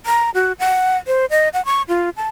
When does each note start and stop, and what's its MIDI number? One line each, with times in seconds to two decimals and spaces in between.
0.06 0.30 82
0.35 0.52 66
0.59 0.97 78
1.07 1.26 72
1.30 1.49 75
1.54 1.64 78
1.65 1.82 85
1.89 2.10 65
2.17 2.29 81